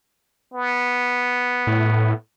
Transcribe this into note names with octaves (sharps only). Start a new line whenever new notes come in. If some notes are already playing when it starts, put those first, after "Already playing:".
B3
A2